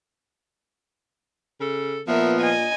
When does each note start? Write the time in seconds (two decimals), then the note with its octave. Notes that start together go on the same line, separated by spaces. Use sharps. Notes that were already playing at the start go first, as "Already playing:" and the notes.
1.61 C#3 A4
2.08 A#2 F3 B3 A#4 E5
2.40 D#5 G#5